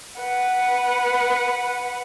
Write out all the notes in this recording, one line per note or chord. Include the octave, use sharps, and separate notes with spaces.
B4 F#5